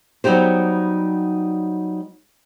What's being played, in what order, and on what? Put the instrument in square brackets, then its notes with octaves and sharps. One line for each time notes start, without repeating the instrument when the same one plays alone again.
[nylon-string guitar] F#3 G3 B3 D#4 G4 C5